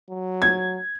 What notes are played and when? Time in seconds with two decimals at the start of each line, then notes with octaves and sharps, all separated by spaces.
0.10 F#3
0.42 G#6